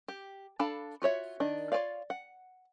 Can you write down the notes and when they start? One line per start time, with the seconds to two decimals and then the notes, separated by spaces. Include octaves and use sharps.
0.08 G4
0.59 D4 A4 F5 A5 B5
1.02 F4 F#4 C#5 E5
1.40 D#3 D4 D#5
1.72 F4 B4 C#5 D5 F5
2.10 F#5